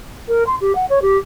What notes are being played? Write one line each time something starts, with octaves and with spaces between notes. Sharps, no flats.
A#4
C6
G4
F#5
C#5
G4